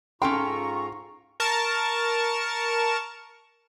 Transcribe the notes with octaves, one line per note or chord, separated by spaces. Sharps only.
G#2 C#4 F4 A4 G5 A#5 C6 C#6
A#4 A5 C#6